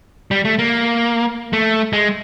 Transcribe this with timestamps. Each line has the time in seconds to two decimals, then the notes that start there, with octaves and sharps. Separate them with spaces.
0.31 G3
0.45 A3
0.59 A#3
1.53 A3
1.93 G#3